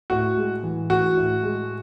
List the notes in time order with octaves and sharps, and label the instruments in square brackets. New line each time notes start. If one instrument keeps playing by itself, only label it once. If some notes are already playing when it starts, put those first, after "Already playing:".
[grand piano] A2 [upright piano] F#4
[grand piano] G#3
E3
[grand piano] A2 [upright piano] F#4
[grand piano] A2
G#3